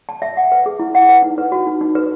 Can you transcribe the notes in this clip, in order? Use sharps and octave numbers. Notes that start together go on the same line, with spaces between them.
A5
E5
F#5
B4
G#4
E4
F#5
B4
D#4
B4
F#4
D#4
D#4
B4